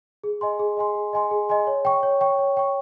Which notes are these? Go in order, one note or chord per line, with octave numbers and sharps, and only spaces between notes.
G#4
D#5 G#5 C6
G#4
D#5 G#5 C6
G#4
D#5 G#5 C6
G#4
D#5 G#5 C6
C#5
G5 C#6
C#5
G5 C#6
C#5
G5 C#6